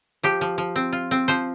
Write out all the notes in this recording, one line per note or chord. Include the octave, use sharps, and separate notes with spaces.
F3 G4
F3
F3
C4
F4
C4
F3 C5